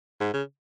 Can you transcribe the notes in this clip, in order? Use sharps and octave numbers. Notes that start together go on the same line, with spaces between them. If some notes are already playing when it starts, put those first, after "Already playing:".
G#2
C#3